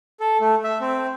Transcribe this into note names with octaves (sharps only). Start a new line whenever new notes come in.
A4
A3
E5
C4